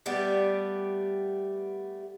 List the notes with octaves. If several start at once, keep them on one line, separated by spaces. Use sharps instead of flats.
G3 A3 B3 G4